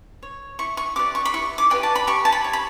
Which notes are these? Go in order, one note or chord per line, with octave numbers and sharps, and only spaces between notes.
C#5
E4 C#6
C#6
G4 B4 D5 D6
C#6
B5
E4 C#6
D6
G4 B4 D5 G5
A5
B5
G4 C#6
A5
B5
C#5
B5